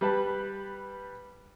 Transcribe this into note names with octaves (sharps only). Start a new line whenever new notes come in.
G3 B4 A5